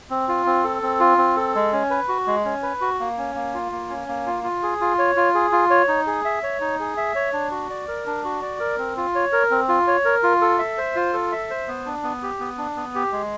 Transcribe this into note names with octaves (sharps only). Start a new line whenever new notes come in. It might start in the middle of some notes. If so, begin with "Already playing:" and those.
C4
F4
C4
A4
C4
F4
C4
A4
G#3
C#4
B4
F#4
G#3
C#4
B4
F#4
A#3
C#4
A#3
F4
A#3
C#4
A#3
F4
F4
G#4
F4
C#5
F4
G#4
F4
C#5
D#4
G#4
E5
C#5
D#4
G#4
E5
C#5
D4
F#4
D5
A#4
D4
F#4
D5
A#4
C4
F4
C#5
A#4
C4
F4
C#5
A#4
F4
A4
E5
C5
F4
A4
E5
C5
B3
D4
B3
G4
B3
D4
B3
G4
G#3